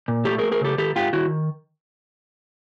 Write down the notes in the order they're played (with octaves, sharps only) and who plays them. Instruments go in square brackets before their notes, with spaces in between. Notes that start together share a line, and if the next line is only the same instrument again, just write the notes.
[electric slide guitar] A#2
A3 G4 A4
A3 G#4 A#4
G#4 A#4
C#3 G4 A4
D#3 G4 A4
G#2 F4 G4
D#3 E4 F#4